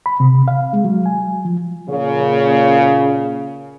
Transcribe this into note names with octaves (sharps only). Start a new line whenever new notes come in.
B5
C3
F5
G#3
F#3
G#5
F3
A#2 C#3